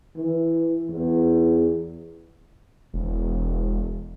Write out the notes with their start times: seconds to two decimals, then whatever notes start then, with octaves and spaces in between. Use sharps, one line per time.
0.17 E3
0.91 E2
2.94 E1